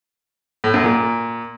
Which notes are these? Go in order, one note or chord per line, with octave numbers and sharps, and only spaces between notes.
A2
F#2
A#2